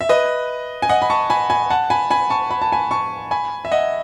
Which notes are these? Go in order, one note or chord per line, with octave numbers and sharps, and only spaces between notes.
E5
B4 D#5
G#5
D#5 F#5
B5
A5 C#6
G#5 B5
G#5 B5
F#5 A5
G#5 B5
G#5 B5
A5 C#6
B5
A5
G#5 B5
A5 C#6
G#5 B5
E5
D#5 F#5